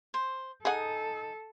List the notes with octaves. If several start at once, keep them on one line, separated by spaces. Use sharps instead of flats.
C5
D#4 G#4 A4 F#5 G#5 D#6